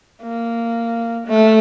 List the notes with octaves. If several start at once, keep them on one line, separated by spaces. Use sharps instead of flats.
A#3
A3